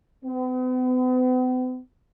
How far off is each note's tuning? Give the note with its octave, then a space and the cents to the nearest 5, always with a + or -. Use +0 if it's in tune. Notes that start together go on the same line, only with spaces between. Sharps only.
B3 +45